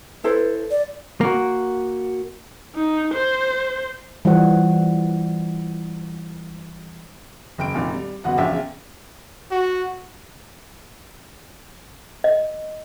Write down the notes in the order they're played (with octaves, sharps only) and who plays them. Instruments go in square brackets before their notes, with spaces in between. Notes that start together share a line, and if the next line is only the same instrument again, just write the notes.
[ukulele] E4 A4 C5 [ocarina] B4
[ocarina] D5
[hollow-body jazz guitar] A#3 F#4
[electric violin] D#4
C5
[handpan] E3 G3 F4 C5 F#5
[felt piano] F#1 G5 D7
F1 A#2 D#3
G3
F#1 B3 F#4 F#5
A#1 E2 C#3 E5 F5 G5
[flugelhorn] F#4
[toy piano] D#5